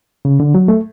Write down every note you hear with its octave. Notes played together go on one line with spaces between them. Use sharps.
C#3
D3
F#3
A3